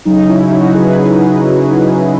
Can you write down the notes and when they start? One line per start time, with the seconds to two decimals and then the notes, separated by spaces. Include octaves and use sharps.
0.05 C#3 F#3 D#4
0.28 C#4 E4
0.51 D#4 F#4
0.74 G#4 B4